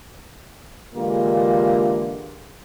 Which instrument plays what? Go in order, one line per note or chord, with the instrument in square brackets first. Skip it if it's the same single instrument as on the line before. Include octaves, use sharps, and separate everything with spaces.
[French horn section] D3 E3 G#3 A#3 F4 G4